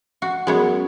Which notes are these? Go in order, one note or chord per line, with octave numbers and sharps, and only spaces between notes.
F#4
F#2 G#3 B3 C#5